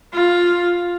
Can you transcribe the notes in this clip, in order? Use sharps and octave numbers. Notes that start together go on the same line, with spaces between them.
F4